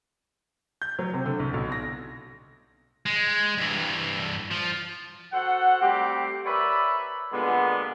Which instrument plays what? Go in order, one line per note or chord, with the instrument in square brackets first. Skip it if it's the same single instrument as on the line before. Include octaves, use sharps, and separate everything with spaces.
[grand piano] G6
F#3
C3
D3
C2
B1
A#6
[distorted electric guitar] G#3
G2 E3
F3
[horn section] F#4 A4 C5 F#5
G3 A3 C4 G4
A#4 B4 C#5 D5 E5 B5
A#2 D3 G3 G#3 B3